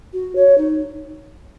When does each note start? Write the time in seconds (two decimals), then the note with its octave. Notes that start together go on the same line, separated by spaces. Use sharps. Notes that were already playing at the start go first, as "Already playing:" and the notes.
0.13 F#4
0.36 C#5
0.58 D#4